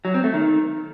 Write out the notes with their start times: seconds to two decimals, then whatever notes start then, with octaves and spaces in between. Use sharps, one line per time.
0.05 F#3
0.14 C4
0.24 A3
0.34 D#3